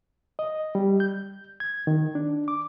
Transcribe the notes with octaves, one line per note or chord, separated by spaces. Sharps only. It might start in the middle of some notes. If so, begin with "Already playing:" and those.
D#5
G3
G6
G#6
D#3
D4
D6